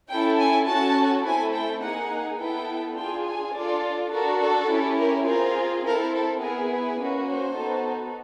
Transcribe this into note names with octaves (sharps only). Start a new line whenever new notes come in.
C#4 E4 A4 G5
G#5
C#4 F#4 A4 A5
A3 C4 E4 A4 G#5
G5
A#3 D#4 G#4 F#5
B3 E4 A4 G5
D4 F4 G#4 G5
G#5
D4 F4 A4 D5
D4 F#4 A4 A#4
A4
C#4 E4 G4
A#4
C4 F4 G#4 A#4
C4 E4 A4 A#4
A4
B3 E4 G#4 A#4
B4
A#3 C#4 F#4
C5
B3 D#4 F#4 A4